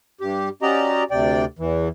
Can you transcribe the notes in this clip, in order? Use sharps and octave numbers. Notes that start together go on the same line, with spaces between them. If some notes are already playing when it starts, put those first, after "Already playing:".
G2 G4
C#4 F#4 G4 D5 D#5 A#5
D2 C3 D5 G5
E2 E3